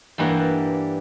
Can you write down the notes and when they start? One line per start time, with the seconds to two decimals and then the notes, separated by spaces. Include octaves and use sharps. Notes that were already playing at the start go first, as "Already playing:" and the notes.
0.18 G2 E3 G3 A#3 F#5